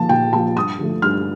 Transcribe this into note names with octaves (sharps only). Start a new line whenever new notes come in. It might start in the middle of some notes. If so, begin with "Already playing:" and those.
Already playing: F3 A#3 F4 A5
A#2 G5
F3 A#3 F4 A5
G2 D#6
D3 F3 A3
G2 F6